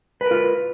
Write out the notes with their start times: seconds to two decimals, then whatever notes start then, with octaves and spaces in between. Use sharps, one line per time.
0.21 B4
0.26 A#4
0.31 F4